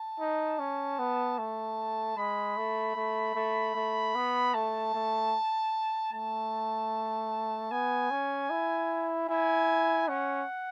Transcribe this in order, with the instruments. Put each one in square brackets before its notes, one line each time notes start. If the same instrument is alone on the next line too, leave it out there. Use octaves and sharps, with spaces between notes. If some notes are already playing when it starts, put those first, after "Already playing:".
Already playing: [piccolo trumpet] A5
[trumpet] D#4
C#4
B3
[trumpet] A3 [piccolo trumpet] A5
[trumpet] G#3 [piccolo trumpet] B5
[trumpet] A3
A3
A3
A3
B3
[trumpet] A3 [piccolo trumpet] A5
[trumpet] A3
[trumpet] A3 [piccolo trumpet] A5
[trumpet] B3 [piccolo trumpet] G#5
[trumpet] C#4
E4
[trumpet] E4 [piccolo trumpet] G#5
[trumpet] C#4 [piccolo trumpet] F#5